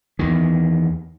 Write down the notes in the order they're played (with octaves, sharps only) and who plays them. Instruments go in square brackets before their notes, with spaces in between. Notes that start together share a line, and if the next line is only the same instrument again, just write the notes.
[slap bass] E2 D#3